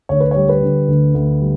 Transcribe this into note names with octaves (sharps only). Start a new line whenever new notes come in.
D2 C#5
B4
G3 C#5
B4
D3
D2
D2
G3